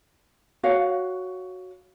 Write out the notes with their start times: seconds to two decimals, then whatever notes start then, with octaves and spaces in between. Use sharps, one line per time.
0.63 F#4 C#5 F5 F#5